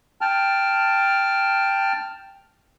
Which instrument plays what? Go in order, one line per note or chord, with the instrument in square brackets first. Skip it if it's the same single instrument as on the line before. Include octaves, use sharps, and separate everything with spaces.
[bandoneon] G5 A5 F6